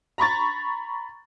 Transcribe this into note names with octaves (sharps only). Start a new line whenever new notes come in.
A#5 B5 C#6 A6